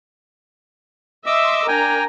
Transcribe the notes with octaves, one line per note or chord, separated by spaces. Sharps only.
D#5 E5 C6 D6 E6
D4 A#4 G5 G#5 A#5